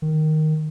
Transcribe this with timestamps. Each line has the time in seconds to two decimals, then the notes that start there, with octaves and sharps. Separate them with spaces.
0.02 D#3